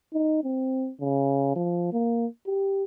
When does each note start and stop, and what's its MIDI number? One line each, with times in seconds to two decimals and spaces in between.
0.13 0.40 63
0.44 0.91 60
1.00 1.53 49
1.56 1.91 53
1.92 2.26 58
2.46 2.84 67